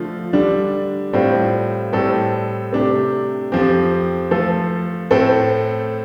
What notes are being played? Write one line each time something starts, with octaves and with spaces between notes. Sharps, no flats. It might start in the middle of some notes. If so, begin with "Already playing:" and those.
Already playing: D3 F3 A3 F4
D3 G3 D4
A2 G3 C4 F4
A2 G3 C4 A4
C3 A3 D4 G4
F2 F3 C4 G4
F3 A3 F4 A4
A2 A3 C4 A4